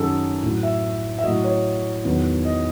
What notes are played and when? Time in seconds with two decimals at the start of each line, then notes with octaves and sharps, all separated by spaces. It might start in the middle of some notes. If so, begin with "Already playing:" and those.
Already playing: F#2 D#3 F#3 G#4 A4
0.43 A2 F#3
0.63 E5
1.19 E5
1.24 A2 F#3 D#5
1.44 C#5
2.04 E2 D#3 F#3
2.45 D#5